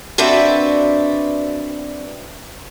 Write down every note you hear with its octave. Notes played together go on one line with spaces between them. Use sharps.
C4 D4 F#4 B4 D5 E5